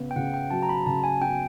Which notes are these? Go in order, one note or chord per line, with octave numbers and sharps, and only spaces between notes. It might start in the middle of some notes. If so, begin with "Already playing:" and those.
Already playing: C#3 B3
G5
C#3 F#5
G5
F#3 A5
A#5
B5
C#3 A5
G#5
B3 G5